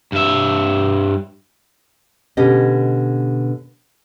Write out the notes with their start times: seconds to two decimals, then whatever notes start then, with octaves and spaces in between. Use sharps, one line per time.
0.12 G2 E5
2.37 B2 D3 C#4 G4 D#5